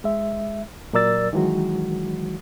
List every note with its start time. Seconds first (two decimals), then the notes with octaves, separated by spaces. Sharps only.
0.04 G#3 E5
0.93 A#2 F#3 A#4 D5 E6 A6
1.33 D#3 E3 F#3 G#3 F#4